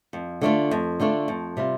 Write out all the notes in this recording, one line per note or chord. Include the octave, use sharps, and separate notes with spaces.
F2
D3 A3 D4 F4
F2
D3 A3 D4 F4
F2
C3 G3 F4